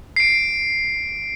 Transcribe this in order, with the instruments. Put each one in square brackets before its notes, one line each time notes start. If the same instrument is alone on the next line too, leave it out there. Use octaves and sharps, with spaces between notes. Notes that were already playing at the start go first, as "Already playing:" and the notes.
[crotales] C7 D7